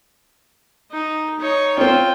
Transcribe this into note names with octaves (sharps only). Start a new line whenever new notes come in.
D#4
D#4 C#5
C4 C#4 F4 G5